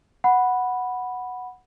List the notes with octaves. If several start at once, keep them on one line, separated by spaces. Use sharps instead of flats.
F#5 B5